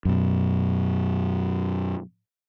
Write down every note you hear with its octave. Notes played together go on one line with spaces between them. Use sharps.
F#2 B2